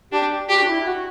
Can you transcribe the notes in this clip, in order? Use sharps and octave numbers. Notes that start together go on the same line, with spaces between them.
D4 G4
F#4 G4
D4
E4
E4
F#4